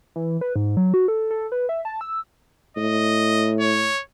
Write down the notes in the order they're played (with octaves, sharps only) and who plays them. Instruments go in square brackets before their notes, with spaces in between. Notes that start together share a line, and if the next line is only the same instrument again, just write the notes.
[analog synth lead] E3
B4
G#2
F#3
F#4
A4
A4
B4
E5
A5
E6
[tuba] A2 [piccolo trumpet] D#5
[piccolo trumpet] C#5